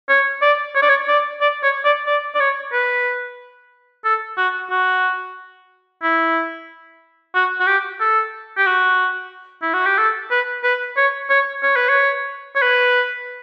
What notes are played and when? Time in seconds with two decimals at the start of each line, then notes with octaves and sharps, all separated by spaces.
0.09 C#5
0.42 D5
0.75 C#5
0.82 D5
0.89 C#5
1.08 D5
1.41 D5
1.63 C#5
1.85 D5
2.06 D5
2.35 D5
2.40 C#5
2.73 B4
4.05 A4
4.37 F#4
4.70 F#4
6.03 E4
7.34 F#4
7.60 F#4
7.67 G4
8.00 A4
8.57 G4
8.66 F#4
9.62 E4
9.74 F#4
9.86 G4
9.98 A4
10.31 B4
10.64 B4
10.97 C#5
11.30 C#5
11.63 C#5
11.76 B4
11.89 C#5
12.55 C#5
12.62 B4